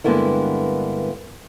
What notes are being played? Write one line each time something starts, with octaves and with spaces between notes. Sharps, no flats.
G2 D3 G#3 A#3 B3 E4